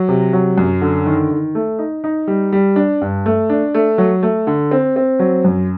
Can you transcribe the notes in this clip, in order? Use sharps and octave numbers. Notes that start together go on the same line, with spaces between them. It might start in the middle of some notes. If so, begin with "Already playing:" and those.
Already playing: F#3
C3
F#3
F#2
D3
D#3
D#3
A3
D#4
D#4
G3
G3
D4
G2
A3
D4
A3
F#3
A3
D3
C4
C4
F#3
F#2